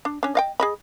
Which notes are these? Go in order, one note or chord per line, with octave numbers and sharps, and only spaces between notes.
D4
C#4 D4
D#5 F5 G5
G#4 D#5 B5